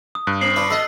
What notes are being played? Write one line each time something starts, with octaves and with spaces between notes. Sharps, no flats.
D#6
G2 F#6
B3 C7 F#7
D4 F4 B4
B2 A4 D#5